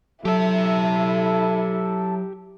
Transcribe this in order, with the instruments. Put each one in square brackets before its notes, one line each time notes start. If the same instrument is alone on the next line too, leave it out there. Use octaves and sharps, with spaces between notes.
[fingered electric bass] F#3 [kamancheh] E4 [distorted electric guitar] G4 E5 [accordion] A4